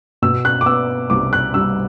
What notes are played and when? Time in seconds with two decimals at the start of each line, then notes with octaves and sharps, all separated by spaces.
0.22 B2 E6
0.45 F#6
0.61 D6
0.66 B3 E6
1.10 C2 D6
1.33 F#6
1.54 G3 E6